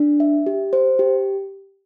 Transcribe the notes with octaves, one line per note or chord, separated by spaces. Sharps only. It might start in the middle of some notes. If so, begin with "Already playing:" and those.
Already playing: D4
E5
G4
C5
G4